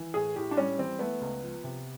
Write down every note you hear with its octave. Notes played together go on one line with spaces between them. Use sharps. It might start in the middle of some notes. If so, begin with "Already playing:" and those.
Already playing: E3
A2 G#4
A2 G4
D4
G3 C#4
E3 C4
A3 B3
C#2
F3
C3